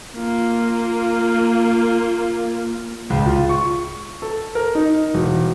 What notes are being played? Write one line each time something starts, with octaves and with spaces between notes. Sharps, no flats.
A#3 F4
C#2
F4
C#6
A4
A#4
D#4
E1